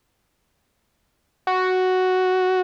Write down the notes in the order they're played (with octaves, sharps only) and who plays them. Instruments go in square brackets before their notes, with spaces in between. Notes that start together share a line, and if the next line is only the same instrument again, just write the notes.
[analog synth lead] F#4